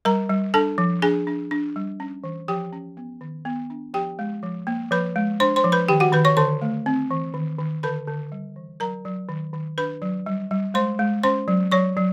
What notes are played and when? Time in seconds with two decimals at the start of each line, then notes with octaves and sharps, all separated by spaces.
0.05 G3 A#4 A#5
0.29 G3
0.54 D4 A4 A5
0.78 F3
1.02 D4 G#4 G#5
1.27 D4
1.51 D4
1.76 G3
2.00 C#4
2.24 E3
2.48 F3 G4 G5
2.72 C#4
2.97 B3
3.21 D#3
3.45 B3
3.70 D4
3.94 F3 G4 G5
4.19 G#3
4.43 F3
4.67 A#3
4.91 F3 B4 B5
5.16 G#3
5.40 D4 C5 C6
5.56 C5 C6
5.64 F3
5.72 B4 B5
5.88 D#3 G4 G5
6.00 F#4 F#5
6.12 D#3 B4 B5
6.25 C#5 C#6
6.37 D3 C5 C6
6.62 A3
6.86 C4
7.11 E3
7.34 D#3
7.59 D#3
7.83 D3 B4 B5
8.07 D3
8.32 G3
8.56 E3
8.80 F#3 A#4 A#5
9.05 F#3
9.29 D#3
9.53 D#3
9.78 D4 B4 B5
10.02 F#3
10.26 G3
10.51 G3
10.74 G#3 C5 C6
10.99 G#3
11.23 C#4 C5 C6
11.48 F#3
11.71 F#3 C#5 C#6
11.97 F#3